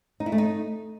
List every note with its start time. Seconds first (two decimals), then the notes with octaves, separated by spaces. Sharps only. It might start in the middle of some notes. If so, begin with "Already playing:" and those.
0.20 D#4
0.26 E4
0.32 A3
0.38 D#4